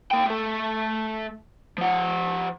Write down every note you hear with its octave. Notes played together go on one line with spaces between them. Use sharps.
A#3 G5
A3 A4
F3 F#5